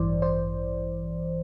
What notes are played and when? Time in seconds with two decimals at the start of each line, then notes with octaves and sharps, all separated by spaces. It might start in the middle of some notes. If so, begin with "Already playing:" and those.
Already playing: A1 G2 E3 C5 D5
0.22 C5 D5